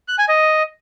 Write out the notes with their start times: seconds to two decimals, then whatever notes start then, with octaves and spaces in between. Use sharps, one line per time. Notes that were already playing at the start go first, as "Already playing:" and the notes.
0.08 F#6
0.18 G#5
0.28 D#5